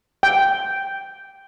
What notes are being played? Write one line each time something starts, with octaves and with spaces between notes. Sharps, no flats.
G5